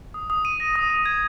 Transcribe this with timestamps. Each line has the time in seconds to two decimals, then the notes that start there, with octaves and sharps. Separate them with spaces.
0.14 D#6
0.30 D#6
0.45 D#7
0.60 A#6
0.75 D#6
0.90 D#6
1.06 G#6